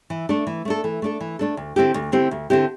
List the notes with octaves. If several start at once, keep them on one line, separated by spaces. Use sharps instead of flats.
E3
A3 D4 A4
E3
A3 D4 A4
E3
A3 D4 A4
E3
A3 D4 A4
D2
D3 C4 E4 G4
D2
D3 C4 E4 G4
D2
D3 C4 E4 G4